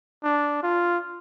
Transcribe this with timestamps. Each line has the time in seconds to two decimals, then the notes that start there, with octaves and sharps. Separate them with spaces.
0.24 D4
0.63 F4